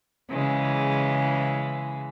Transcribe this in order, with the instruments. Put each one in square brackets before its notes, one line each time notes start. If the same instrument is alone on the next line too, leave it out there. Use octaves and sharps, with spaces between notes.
[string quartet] C#3 E3 G#3